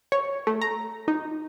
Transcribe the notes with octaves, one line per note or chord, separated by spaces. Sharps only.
C#5
A3
A#5
D#4